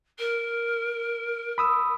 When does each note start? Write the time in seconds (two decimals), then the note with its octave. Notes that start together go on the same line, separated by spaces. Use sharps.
0.18 A#4
1.58 B5 D#6 E6